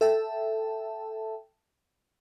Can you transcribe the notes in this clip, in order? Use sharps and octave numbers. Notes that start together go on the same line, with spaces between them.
A4 E5 G5 A5